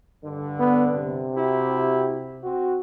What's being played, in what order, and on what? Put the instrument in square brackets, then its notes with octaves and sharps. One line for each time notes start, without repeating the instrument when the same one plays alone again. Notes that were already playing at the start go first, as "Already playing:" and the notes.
[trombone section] G2 D3
[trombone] B3
C3
[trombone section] E4 F#4 G4
C4 F#4